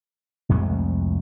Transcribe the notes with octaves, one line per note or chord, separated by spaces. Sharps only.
C2 F2 G#3 A3